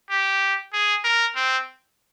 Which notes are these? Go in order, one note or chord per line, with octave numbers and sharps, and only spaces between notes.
G4
G#4
A#4
C4